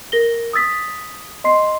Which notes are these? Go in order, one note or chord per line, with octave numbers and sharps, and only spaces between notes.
A#4 A#6 G7
D#6 E6 A6 B6
D#5 C6 C7